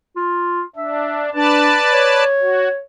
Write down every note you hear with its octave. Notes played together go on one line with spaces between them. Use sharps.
F4
D4 E5
D4 B4 D5 A5
C#5
F#4